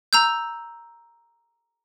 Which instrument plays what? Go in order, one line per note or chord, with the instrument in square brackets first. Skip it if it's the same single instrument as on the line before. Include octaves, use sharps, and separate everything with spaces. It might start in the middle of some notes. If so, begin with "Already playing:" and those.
[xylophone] A#5 E6 G6